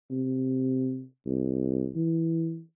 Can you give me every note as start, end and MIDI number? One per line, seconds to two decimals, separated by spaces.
0.11 1.04 48
1.26 1.90 36
1.96 2.61 52